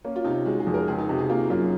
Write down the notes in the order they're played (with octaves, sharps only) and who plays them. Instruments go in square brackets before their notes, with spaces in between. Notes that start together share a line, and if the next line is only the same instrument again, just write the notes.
[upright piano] A#3 [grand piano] C#4
[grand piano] F4
[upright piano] C3 [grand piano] D#4
[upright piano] G#3 [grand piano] F#4
[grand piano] G#4
[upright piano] F2
[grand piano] A#4
[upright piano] C#2 [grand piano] G#4
[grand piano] D#4
[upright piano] C3 [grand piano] F#4
[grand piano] G#4
[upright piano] A#3 [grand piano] F4
[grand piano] F#4
[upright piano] F#2 [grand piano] F4
[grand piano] F#3